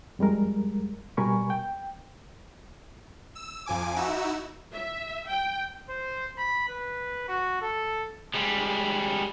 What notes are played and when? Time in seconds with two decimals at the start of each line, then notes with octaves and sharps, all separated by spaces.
0.19 F2 G3 G#3 A#4
1.17 B2 G3 A#4 G#5 B5 C#6
1.50 G5
3.35 E6
3.66 F2 F3 G#5 D6
3.96 D#4 E4 F#4 E6
4.74 E5
5.29 G5
5.90 C5
6.38 B5
6.69 B4
7.28 F#4
7.62 A4
8.34 G3 G#3